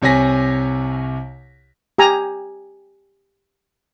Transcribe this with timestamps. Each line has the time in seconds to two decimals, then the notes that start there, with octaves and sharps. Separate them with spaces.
0.02 C2 C3 C#5 G#5 A#6 B6
1.98 G4 G#5 A#5